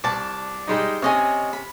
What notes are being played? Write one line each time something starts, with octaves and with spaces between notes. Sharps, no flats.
C2 D5 A5
G3 G#3 D#4
C3 C#4 C#5 D#5 G#5
B5